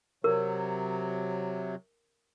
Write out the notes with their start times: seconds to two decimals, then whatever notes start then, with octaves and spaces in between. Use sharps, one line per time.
0.24 C3 F#3 A#4